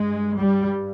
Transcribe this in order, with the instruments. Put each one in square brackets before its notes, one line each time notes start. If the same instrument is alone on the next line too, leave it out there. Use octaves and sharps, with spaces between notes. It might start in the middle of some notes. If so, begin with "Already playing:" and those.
Already playing: [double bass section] G2 G#3
G3